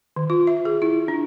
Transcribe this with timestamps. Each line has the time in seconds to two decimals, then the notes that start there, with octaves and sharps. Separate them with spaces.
0.16 D#3
0.30 F4
0.47 E5
0.65 G#4
0.82 E4
1.08 D4